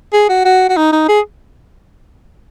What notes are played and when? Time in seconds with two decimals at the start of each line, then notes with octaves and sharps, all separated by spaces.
0.13 G#4
0.29 F#4
0.45 F#4
0.70 F#4
0.77 D#4
0.93 D#4
1.09 G#4